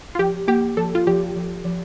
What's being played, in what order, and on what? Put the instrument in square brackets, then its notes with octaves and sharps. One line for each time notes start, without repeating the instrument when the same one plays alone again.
[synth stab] F4
[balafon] F3 [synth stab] G4
[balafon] A#3 [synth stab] G4
[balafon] F3 [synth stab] A4
[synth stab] F4
[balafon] F3 [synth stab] G4
[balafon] F3
F3